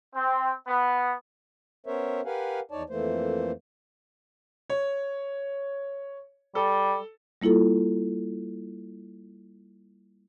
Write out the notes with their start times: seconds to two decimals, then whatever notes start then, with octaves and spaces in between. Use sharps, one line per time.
0.15 C4
0.67 B3
1.86 B3 C#4 A#4 C5 C#5 E5
2.25 G4 A#4 B4 F5 F#5 G#5
2.71 E2 D#4 C#5 D5 A5
2.90 F2 E3 A3 A#3 C5
4.70 C#5
6.55 G3 A4
7.42 G3 A#3 E4 F4 A4